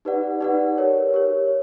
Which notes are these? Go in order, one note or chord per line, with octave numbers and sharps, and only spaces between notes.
D#4 G4 B4 D5 F#5
D#4 G4 B4 D5 F#5
G4 A#4 C#5
G4 A#4 C#5